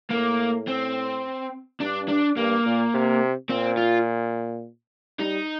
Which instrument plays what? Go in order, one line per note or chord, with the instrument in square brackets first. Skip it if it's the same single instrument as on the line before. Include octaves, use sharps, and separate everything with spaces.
[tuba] A2 [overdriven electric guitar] A#3
[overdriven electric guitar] C4
[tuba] G2 [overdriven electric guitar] D4
[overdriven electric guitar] D4
[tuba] G2 [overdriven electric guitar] A#3
[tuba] A#2
C3
[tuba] A#2 [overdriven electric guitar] C4
[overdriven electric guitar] F4
[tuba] G3 [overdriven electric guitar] D#4